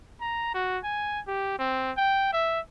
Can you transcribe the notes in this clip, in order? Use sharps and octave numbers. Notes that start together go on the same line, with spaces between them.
A#5
F#4
G#5
G4
C4
G5
E5